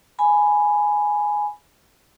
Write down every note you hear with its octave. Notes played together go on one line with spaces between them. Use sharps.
G#5 B5